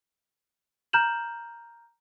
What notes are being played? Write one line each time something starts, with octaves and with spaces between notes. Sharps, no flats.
A#5 F6 G6 E7 F#7